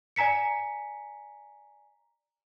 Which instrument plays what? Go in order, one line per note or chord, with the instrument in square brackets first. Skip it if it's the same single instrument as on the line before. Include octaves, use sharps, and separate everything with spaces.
[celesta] D5 G#5 A#5 B6 C#7